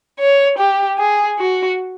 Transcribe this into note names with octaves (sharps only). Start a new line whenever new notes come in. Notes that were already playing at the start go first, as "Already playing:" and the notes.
C#5
G4
G#4
F#4